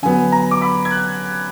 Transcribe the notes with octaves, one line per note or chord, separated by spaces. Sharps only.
D3 F#3 B3 G#5
A#5
D6
B5
G#6
F#6